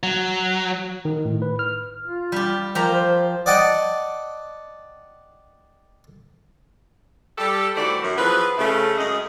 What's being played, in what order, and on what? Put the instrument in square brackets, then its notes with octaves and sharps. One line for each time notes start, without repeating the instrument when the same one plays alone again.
[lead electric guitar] F#3
[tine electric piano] D#3
A2
B4
F6
[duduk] F4
[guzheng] G3 G4
[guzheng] F3 G4 A#5 [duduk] A#4
[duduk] C5
[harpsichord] D5 D#5 F#5 G5 A5
[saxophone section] G3 G4 A4
D#3 E3 A3 F#4 C5 D5
F#2
E3 F3 B3 G#4 B4
C#3 A3
F#2 G#3 D#5